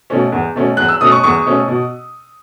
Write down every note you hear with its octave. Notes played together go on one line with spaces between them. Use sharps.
B2 A3 C#4
E2
B2 A3 C#4
E2 F#6
E6
B2 A3 C#4 D#6
C#6
E2 C#6
B2 A3 C#4
B2